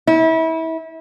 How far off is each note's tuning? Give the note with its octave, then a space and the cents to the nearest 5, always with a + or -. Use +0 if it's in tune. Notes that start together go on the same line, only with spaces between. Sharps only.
E4 -30